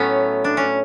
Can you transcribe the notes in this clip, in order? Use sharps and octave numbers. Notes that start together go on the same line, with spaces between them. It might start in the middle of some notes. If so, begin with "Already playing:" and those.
Already playing: A2 F#3 A3 B3 C#4
D4
C#4